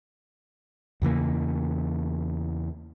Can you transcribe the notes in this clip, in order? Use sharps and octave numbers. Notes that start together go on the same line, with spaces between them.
E2 C#3 E3 A#3